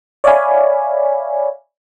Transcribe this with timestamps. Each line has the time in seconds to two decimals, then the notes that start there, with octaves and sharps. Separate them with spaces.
0.24 C#5 D5 E5 F5 G#5 B5